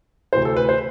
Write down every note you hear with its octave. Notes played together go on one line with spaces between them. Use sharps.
D2 C3 E3 C5
A4
B4
C5